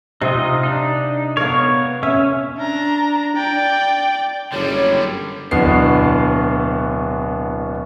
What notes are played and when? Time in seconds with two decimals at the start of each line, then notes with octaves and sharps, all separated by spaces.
0.22 C3 D#4 F4 D#5
0.63 D4 D#4
1.37 B3 A#4 C#5 F5
2.03 C#4 E5
2.58 D4 A#5
3.36 D5 G5
4.53 F#1 D3 G3 C#5
5.51 D1 B2 D3 E3 B3 C7